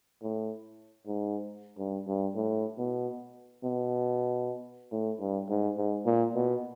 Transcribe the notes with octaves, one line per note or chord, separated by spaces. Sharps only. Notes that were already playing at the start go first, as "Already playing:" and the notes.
A2
G#2
G2
G2
A2
B2
B2
A2
G2
G#2
G#2
A#2
B2